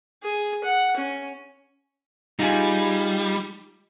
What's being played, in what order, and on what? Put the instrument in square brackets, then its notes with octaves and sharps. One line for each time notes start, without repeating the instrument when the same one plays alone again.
[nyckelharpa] G#4
F#5
C#4
[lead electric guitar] G3 [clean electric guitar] D#4 F4 G#4